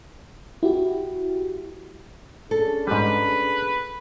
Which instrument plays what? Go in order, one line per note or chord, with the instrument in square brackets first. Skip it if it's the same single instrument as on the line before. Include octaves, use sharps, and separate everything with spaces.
[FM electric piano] E4 F#4 G4
[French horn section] C#4 D4 G#4 [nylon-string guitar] A4
[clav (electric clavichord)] G#2 G3 [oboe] B4